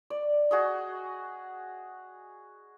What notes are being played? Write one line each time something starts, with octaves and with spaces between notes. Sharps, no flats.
D5
F#4 G#4 D#5